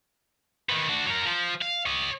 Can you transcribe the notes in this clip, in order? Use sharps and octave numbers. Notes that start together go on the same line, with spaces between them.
D#3 B3
D4 F#4
F#3 A#4
F3
F5
C#5 D#5